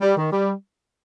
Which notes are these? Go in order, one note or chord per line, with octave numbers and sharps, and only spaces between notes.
G3
D#3
G3